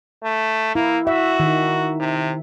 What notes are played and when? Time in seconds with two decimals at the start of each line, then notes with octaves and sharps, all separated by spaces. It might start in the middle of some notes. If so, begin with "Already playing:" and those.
0.24 A3
0.75 A#3 E4
1.07 F#4 E5
1.40 D#3
2.00 C3